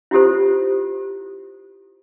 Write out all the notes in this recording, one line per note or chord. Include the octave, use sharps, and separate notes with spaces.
E4 F4 G4 A4 C5